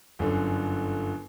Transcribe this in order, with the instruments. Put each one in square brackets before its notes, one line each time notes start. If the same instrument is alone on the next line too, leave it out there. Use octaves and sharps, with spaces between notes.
[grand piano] G1 F#2 D3